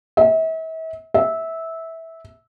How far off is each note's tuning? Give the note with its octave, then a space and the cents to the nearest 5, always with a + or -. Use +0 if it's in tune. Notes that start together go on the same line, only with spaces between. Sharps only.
E5 -40
E5 -15